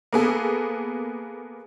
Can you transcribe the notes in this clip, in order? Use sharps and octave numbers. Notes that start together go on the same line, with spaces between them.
A#3 B3 G#4 A4